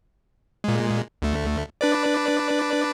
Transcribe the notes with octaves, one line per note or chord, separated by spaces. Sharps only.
A#2 G#3
D2 A3
D4 B4 D5